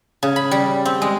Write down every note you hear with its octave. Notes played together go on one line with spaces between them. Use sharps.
C#3
B5
G3
C4
G#3